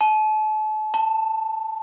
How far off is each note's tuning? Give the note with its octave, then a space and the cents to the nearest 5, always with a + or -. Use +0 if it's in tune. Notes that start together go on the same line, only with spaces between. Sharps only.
A5 -35
A5 +15